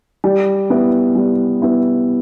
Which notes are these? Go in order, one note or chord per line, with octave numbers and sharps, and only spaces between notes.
G3
B3 E4
G3
B3 E4